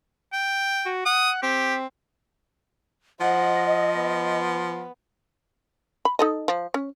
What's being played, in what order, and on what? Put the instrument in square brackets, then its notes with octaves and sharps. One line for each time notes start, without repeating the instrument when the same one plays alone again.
[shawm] G5
[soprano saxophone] F#4
[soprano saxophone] F#5 [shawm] D#6
[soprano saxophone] C4 [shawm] G4
[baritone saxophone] F3 [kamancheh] C5 F#5 [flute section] D#5
[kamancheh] B3
[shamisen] B5
D#4 A4 D#5
F3
C#4